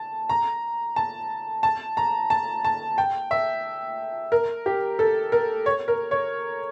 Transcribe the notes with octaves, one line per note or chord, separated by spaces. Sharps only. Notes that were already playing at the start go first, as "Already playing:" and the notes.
Already playing: A5
A#5
A5
A5
A#5
A5
A5
G5
E5
A#4
G4
A4
A#4
C#5
A#4
C#5